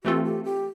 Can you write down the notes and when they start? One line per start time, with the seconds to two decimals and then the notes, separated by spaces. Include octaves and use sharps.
0.04 E3 A3 C4 F4 G4 A4
0.24 G4
0.44 G4